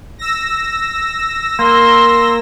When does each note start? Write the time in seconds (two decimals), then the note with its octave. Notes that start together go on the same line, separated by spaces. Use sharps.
0.19 E6 A#6
1.59 A#3 C6